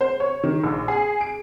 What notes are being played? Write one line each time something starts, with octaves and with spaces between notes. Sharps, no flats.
C5
C#5
D#3
A#1
G#4
D7